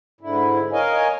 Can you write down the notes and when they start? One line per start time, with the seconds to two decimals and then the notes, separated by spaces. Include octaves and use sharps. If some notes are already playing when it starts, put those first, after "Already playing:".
0.21 G#2 D3 E4
0.73 A#4 C#5 D#5 F5 G#5